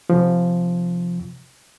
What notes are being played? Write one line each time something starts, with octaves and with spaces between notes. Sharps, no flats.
C3 F3